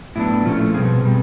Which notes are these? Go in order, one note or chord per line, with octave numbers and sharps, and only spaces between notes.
A2 F#3 B3 D4 E4
A#2 F3 A3 C#4 F4
B2 G3 C4 G#4
B2 G3